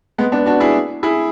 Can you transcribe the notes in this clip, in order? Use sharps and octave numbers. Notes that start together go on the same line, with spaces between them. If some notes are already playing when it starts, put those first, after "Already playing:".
G#3 B3
B3 D4
D4 F#4
E4 G#4
E4 G#4